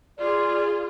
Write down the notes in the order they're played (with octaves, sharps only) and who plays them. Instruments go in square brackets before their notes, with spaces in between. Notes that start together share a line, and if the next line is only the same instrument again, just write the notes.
[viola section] F4 G#4 [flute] D5